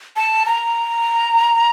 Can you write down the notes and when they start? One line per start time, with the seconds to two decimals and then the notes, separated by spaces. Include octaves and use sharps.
0.16 A5
0.46 A#5